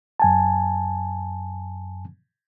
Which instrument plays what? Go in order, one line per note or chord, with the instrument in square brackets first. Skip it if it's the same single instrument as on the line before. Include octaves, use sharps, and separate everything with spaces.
[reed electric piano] F#2 G#5 A5